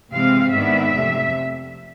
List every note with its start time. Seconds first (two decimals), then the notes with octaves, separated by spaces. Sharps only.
0.13 C3 E3 G#3 C4 F5
0.53 G#2 D#3 G#3 B3 D4 E5
0.93 F2 C3 F3 A3